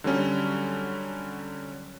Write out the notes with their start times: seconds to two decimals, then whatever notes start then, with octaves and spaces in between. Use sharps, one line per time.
0.04 D3 F#3 G3 C#4